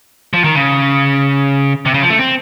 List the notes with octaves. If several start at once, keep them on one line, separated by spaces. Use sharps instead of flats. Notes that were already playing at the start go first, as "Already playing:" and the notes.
F3
D#3
C#3
C3
C#3
F3
A3
C4